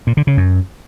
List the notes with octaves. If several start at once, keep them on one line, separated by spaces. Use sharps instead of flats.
A#2
D3
C#3
F#2